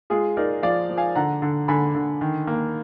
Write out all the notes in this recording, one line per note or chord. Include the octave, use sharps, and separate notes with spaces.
G#3 F4 G#4
D#4 A#4 D5
F3 D5 F5
F3
F5 G#5
D3 F#5 A#5
D3
D3 G#5 B5
D3
D#3
A#3